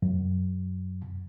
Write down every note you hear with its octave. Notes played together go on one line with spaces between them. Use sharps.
F#2